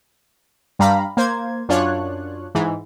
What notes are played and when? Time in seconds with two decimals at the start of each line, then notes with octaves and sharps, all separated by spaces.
0.79 G2 G3 F5 A#5 B5
1.17 A#3 C5 G#6
1.69 F#2 D4 F4 C#5 F#6
2.55 G#2 E3